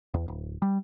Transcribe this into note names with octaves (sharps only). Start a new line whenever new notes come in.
E2
D1
G3